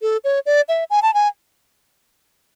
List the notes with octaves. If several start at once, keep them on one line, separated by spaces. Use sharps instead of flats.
A4
C#5
D5
E5
G#5
A5
G#5